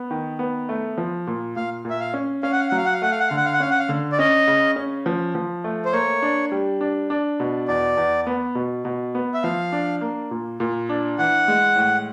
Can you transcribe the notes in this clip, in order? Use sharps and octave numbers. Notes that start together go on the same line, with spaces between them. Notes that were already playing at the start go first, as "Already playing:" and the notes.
Already playing: B3
D#3
B3
A3
F3
A#2
A#2 F5
A#2
E5
F5
C#4
C#4 F5
F#5
F5
F#5
F#3
F5
F#5
F5
A3 F#5
F5
F#5
D3 F5
F#5
F5
F#5
C#4 F5
F#5
F5
D3
D5
C#4 D#5
C#3
C#4
F3
F3
A3
C5
A#3 C#5
D4
G3
D4
D4
B2
E2 D5
E2
B3
B2
B2
B3
E5
F3 F5
D4
A#3
A#2
A#2
D4
E3 F#5
G#3
A2